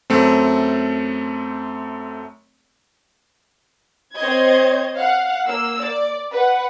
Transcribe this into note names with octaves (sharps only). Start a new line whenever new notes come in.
F#2 A3 C4
C4 C5 C#5 D#5 G#6
F5 F#5
A#3 E6
D5
B4 F#5